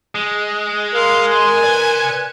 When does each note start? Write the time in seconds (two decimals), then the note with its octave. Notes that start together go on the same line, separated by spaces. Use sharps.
0.15 G#3
0.95 A#4 F5 C6
1.28 G#5 C6 F#6
1.63 B4 D5 C6 F#6